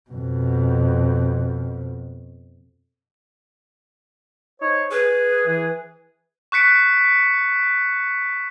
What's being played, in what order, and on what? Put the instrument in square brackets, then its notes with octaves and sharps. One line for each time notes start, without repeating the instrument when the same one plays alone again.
[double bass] F2 B2
[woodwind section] D#4 C5 C#5
[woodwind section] G#4 [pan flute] B4
[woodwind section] E3 G#4
[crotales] C#6 F#6 B6 C#7 D7